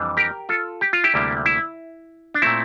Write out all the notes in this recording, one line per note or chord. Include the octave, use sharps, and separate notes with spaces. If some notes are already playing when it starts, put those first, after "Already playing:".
Already playing: F2 E3 G3 D4
G4 A#4
F4 A4
G4
F4
E4 G4
D2 C3 G3 A#3 D4
E4
D4
A#2 A3 C4 E4